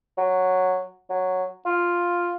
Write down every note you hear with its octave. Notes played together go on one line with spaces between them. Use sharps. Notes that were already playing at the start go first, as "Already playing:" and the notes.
F#3
F#3
F4